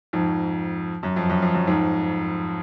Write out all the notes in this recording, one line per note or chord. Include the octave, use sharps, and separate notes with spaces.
F2 G#2
F#2
F2
F#2
F2
F#2
F2 G#2